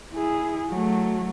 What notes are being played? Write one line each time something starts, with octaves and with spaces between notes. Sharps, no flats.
E4 G#4
F#3 A3